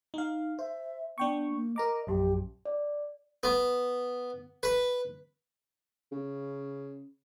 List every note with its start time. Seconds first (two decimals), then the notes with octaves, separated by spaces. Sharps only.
0.14 D#4 F5
0.59 C5 E5
1.18 B3 D4 G5 C#6
1.51 A#3
1.76 A#4 D#5 A#5 D6
2.07 A#1 F#2 G4
2.65 D5
3.43 B3
4.63 B4
6.12 C#3